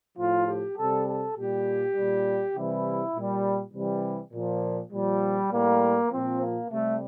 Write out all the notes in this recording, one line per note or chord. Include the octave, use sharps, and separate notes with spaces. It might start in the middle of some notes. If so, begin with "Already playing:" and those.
A2 F3 F4
G4
C3 G3 A4
A4
A#2 G3 G4
A#2 G3
C3 E3 G3 E4
A#2 G3
C3 E3 G3
A#2 F3
A#2 F3 G3
A2 G3 A#3
A#2 F3 C4
A#3
C3 G3 A3